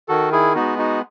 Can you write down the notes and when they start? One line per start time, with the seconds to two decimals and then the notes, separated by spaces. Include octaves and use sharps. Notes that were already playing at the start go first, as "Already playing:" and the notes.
0.08 D#3 F#4 A4
0.32 E4 G#4
0.55 G#3 B3 D#4 F#4
0.79 D#4 F#4